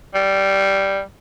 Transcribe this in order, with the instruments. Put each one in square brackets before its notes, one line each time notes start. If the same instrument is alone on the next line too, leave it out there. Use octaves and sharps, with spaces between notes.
[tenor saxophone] G3